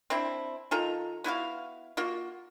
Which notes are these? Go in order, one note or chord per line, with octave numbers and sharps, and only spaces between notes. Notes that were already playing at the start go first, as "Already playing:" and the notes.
C4 D4 E4
D#3 F4 A4 A#5
B3 E4 F#4 F5
A#3 F4 F#4